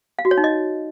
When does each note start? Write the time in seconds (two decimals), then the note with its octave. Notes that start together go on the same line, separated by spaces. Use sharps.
0.19 F5
0.25 F#4
0.31 C#5
0.37 D#4
0.44 D#5